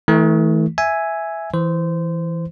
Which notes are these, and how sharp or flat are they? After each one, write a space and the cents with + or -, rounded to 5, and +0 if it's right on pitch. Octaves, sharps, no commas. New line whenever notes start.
E3 -30 A3 +0
E5 +0 G#5 +0
E3 +0 C5 -20